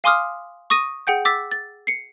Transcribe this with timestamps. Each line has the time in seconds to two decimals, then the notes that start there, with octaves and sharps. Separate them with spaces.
0.04 F5 G#5 C6 D6 D#6 F6
0.70 C#6 D#6 A#6 D#7
1.07 G#4 F#5 G5 G6
1.25 D6 E6 A6 B6
1.52 A6
1.87 C7 C#7